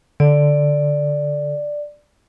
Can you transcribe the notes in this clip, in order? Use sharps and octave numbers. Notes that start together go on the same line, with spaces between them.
D3 D5